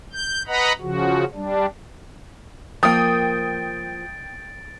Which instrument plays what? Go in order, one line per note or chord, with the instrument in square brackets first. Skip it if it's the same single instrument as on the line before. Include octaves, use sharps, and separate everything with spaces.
[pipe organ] G6
B4 D#5 F#5 A#5 B5
C#3 F3 F#4
G3 D4
[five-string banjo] F3 A#3 [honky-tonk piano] G5 D#6 [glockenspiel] A6 D7